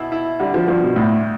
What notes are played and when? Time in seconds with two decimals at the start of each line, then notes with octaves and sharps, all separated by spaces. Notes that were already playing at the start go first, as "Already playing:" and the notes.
Already playing: B2 E4
0.12 E4
0.40 D3 G3
0.54 F3
0.68 G2 F3
0.82 B2
0.96 D2 A2